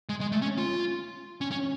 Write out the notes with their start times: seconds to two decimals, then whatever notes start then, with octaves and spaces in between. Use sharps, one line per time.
0.09 G#3
0.21 G#3
0.32 A3
0.42 C#4
0.58 F4
1.41 C#4
1.51 C#4